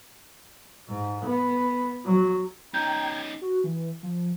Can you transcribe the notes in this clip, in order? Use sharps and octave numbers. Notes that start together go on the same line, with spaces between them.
G#2
B3
F#3
C#4 D#4 G5 A#5 G6 G#6
F#4
E3
F3